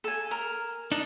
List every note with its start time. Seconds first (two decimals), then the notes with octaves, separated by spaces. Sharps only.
0.04 A4 G#5
0.31 A#4
0.92 D4 D#4